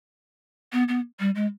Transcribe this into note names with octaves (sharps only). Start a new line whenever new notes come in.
B3
B3
G3
G#3